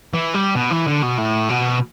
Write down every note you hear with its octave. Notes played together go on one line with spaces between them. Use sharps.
E3
G3
B2
E3
D3
B2
A2
B2